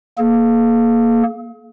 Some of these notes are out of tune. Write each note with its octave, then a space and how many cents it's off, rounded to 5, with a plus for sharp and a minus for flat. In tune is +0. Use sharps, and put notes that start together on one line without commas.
A#3 +0 G#4 +45